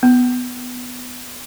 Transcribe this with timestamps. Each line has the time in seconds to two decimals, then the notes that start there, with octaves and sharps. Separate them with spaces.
0.03 B3